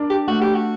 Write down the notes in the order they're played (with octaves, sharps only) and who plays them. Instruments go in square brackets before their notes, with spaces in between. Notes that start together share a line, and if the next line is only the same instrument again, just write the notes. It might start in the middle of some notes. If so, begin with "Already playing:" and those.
Already playing: [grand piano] D4 A#4
[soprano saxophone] G4
[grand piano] A3 [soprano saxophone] F#4
[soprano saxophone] G4
F#4